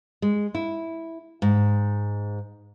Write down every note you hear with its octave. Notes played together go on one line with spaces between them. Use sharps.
G#3
E4
G#2